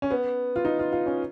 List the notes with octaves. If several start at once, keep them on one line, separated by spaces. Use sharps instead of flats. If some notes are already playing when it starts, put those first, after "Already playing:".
C#4
B3
F4
D#4
F4
F4
C#4